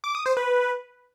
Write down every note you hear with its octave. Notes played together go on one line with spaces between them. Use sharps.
D6
D#6
C5
B4